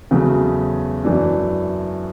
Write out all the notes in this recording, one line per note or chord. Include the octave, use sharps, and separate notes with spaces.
E2 C#3 F#3 A3
F#2 E3 A3 D4